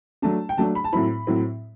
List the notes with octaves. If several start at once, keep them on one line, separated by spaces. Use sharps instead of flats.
F#3 A3 D4 A5
G5
F#3 A3 D4 A5
B5
A5
A2 F#3 C4 E4 B5
A2 F#3 C4 E4